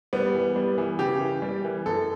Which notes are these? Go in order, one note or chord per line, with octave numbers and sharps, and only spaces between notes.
G3 B3
E3
G3
E3
C#3 G4
E3
G3
E3
F#2 A4